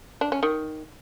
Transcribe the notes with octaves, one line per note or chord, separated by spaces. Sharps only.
D4
C#4
D#3